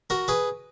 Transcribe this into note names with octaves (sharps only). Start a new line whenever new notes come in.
F#4 A#4
G#4 B4